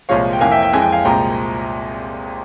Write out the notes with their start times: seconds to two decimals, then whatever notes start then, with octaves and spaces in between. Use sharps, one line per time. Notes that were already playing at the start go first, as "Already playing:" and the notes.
0.09 C2 A#2 F3 G#3 C#5 F5
0.33 G5
0.41 F1 F2 E3 A#3 F5 G#5
0.51 E5 G5
0.62 E5 G5
0.74 F2 E3 G#3 G#5
0.82 G5
0.92 F5 G#5
1.05 C2 A#2 F3 G#3 G5 A#5